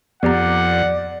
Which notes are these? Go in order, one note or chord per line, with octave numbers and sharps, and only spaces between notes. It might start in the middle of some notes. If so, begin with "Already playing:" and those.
F2 B3 G4 D5 F#5 A#5